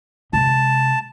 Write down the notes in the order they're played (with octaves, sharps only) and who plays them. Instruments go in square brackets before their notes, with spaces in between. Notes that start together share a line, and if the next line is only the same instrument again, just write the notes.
[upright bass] C3 G#3 [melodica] A5